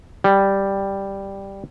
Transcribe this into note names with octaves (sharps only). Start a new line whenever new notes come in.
G3